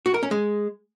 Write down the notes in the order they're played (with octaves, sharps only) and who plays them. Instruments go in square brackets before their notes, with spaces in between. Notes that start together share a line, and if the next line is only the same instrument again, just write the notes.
[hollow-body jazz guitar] F#4
A#4
C#4
G#3